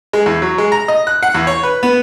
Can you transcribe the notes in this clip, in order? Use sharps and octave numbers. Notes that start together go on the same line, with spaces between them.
G#3
E2
F#3
G#3
A#5
D#5
F#6
F#5
E2
C#5
B4
B3